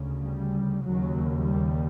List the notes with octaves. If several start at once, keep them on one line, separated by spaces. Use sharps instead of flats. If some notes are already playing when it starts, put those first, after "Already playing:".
Already playing: D2 C#3
G3
D#2 C#3 F#3
G3